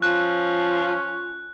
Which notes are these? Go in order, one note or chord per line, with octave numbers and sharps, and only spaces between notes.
F3 C#4 F4 F#6